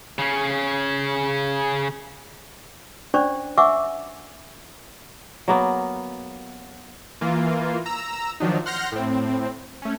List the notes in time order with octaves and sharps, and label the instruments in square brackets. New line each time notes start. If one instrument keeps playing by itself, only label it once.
[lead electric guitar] C#3 C#4
[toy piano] C#4 D4 C5 D5 C#6
E5 F#5 G#5 C#6 D6 E6
[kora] F#3 A#3 B3
[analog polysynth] E3 A#3 F4
A#5 E6
D#3 F3 F#3 D4 D#4
F#5 C6 F6 G6 A#6
A2 C4
A3 C#4